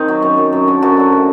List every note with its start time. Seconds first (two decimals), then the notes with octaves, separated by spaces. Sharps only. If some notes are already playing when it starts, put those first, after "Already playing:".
Already playing: D#3 C4 D#4
0.08 F#3
0.22 F#2
0.37 F#3
0.53 F#2
0.67 D3 F#3
0.82 F#2 F#4
0.97 D3 F#3
1.12 A2